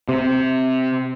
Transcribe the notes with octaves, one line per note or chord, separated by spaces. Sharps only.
C3